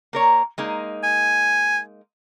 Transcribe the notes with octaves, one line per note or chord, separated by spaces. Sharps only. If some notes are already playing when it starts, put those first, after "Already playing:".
A#3 A#4 C#5
G#3 A#3 D#4
G#5